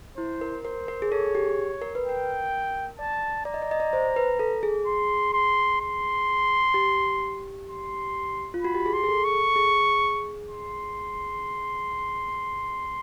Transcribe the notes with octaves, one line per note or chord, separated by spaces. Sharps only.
E4 C5
A#4
A#4 C5
A#4
G#4
A4 C#5
G#4
G4
A#4
B4
A#4 G5
D5 A5
D5 A#5
D#5
D5
D#5
D5
C5
B4
A4
G#4
C6
C6
C6
G4
C6
F4
F#4 B5
G4
G#4
C6
G#4
A4
C#6
A4
G#4
C6